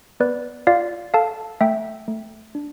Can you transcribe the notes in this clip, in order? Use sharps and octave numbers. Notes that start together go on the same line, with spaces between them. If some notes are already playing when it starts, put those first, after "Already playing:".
B3 B4 D5
F4 D5 F5
A4 F5 A5
A3 E5 G5
A3
D4